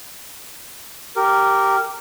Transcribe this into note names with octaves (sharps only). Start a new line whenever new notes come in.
G4 A#4